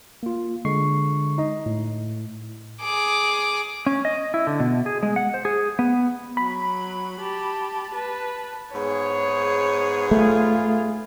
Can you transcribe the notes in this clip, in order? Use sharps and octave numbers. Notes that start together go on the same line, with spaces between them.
A#3 F4
D3 G#3 C#6 C7
D#4 D#5
A2
G#4 D6
C#4
D#5
E4
D3
B2
G#4
G#3
F#5
C5
G#4
B3
F#3 B5
G4 A5
B4 A5
G#2 B3 G#4 C#5
A3 F4